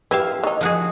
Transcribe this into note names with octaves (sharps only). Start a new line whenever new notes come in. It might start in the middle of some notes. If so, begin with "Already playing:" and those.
E4 G4 B4 E5 F5
D#3 D#4
F3 F#4 G#4